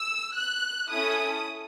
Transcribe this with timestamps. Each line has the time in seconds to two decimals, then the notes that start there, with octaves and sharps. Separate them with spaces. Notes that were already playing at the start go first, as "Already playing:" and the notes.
Already playing: E6
0.36 F#6
0.92 C#4 E4 A4 D#6